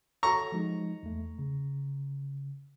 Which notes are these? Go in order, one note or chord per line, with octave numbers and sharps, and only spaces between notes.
F#4 A4 C#5 A#5 C#6
F3 G#3 D#4
E2 A3
C#3